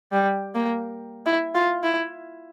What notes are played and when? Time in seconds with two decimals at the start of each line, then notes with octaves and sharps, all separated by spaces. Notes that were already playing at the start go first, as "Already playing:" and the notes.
0.12 G3
0.55 A#3
1.26 E4
1.55 F4
1.84 E4